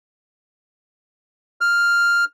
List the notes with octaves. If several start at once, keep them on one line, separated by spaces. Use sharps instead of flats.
F6